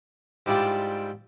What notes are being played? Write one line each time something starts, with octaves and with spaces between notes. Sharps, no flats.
G#2 G3 D4 E4 F4 G4